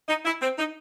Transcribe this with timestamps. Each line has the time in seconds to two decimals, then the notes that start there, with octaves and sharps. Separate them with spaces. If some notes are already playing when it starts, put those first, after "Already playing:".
0.08 D#4
0.25 E4
0.42 C4
0.58 D#4